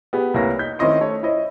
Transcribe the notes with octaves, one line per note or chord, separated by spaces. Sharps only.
B3 G4 G#4
C2 A#3 E4 B4 C#5 A#6
D#4 G6 B6
D#3 C4 C#4 E4 D#5 C6
A3 C#5
E4 C5 C#5 D#5